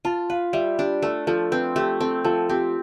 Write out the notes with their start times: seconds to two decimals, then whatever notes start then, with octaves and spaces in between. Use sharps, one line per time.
0.05 F4 A5
0.30 B4 F5
0.53 G3 E5
0.79 D4 G4
1.02 A3 A4
1.27 F3 A4
1.51 C4 B4
1.76 A3 G4
2.01 C4 A4
2.24 F3 A4
2.49 C4 G4